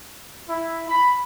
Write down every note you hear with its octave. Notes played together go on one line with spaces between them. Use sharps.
E4
B5